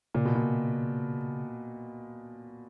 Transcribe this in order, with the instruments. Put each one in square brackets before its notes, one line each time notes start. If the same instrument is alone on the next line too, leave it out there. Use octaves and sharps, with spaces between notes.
[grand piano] A#2 [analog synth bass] C#3
[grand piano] B2
A#2